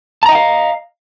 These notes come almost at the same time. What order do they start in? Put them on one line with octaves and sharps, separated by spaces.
A5 A#5 D#5 G5 F5